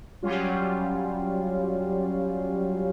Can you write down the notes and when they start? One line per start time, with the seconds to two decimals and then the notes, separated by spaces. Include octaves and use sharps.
0.23 F#3 G3 C#4 F4